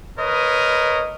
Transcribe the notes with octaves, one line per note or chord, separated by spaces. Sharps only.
A#4 B4 C#5 D#5